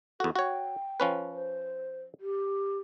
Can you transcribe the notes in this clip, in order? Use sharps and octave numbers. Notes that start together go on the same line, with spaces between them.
E2 F#4 A4
F#4 C#5 G5
F3 C#4 B4
C5
G4